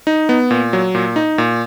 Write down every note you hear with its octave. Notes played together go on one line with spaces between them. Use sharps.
D#4
B3
A#2
F#3
A#2
D#4
A#2